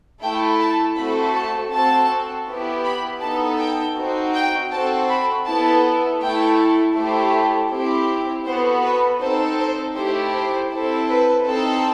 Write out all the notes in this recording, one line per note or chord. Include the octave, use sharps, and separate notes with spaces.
A3 E4 A4 G5
A5
A3 C4 F#4 A4 B5
A5
C4 F#4 A4 A5
B3 E4 G4
B5
B3 D#4 A4 A5
G5
C4 D#4 F#4
G5
C4 F#4 A4 A5
B5
B3 E4 A4 A5
A3 E4 A4 G5
A3 E4 G4 C5
C4 E4 G4
B3 F#4 A4 C5
B4
C4 D#4 A4 C5
C5
A3 E4 G4 C5
C5
C4 E4 A4
B4
C4 D#4 A4